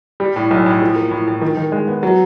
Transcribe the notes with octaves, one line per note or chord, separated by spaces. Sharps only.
G3
A2
B1
A2
F3
A#3
A2
A2
D#3
D#3
G#3
B3
F#3